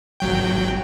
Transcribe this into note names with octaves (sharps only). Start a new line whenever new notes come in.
G#1 F#3 G5